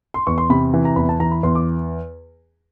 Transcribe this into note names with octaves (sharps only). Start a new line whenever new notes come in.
C6
E2 C#6
C6
C3 B5
E3
A#5
E2 B5
A5
E3 A#5
B5
E2 C6
D6